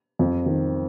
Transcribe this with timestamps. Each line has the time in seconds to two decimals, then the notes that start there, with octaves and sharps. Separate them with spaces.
0.19 F2
0.46 D#3